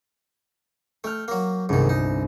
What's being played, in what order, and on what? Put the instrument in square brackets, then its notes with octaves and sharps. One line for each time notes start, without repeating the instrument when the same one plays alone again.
[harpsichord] A3 [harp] G5 F6
[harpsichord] F#3 A#3
[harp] G1 C2 [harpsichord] G#2 D#3
[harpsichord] D#4